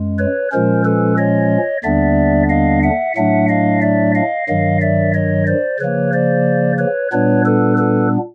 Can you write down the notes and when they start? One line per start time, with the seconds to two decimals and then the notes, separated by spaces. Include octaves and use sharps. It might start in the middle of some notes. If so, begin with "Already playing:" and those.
Already playing: F#2 G#3
0.18 B4 C#5
0.52 A#2 F3 G#3 C#4 A#4 C5
0.85 A4 B4
1.17 C#5 D#5
1.83 D#2 D3 G3 B3 D4 D5 E5
2.49 D#5 F5
2.83 E5 F#5
3.16 A2 F#3 A3 D4 E5 F#5
3.48 D#5 F5
3.81 D5 E5
4.15 D#5 F5
4.48 G2 D#3 F#3 D#5 F5
4.81 D5 E5
5.14 C#5 D#5
5.47 C5 D5
5.79 C#3 F3 A#3 B4 C#5
6.13 C5 D5
6.78 B4 C#5
7.12 A#2 G3 B3 D4 B4 C#5
7.45 A4 B4
7.78 A4 B4